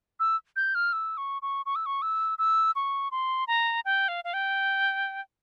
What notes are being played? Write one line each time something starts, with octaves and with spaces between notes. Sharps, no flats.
E6
G6
F6
E6
C#6
C#6
C#6
E6
C#6
E6
E6
C#6
C6
A#5
G5
F5
F5
G5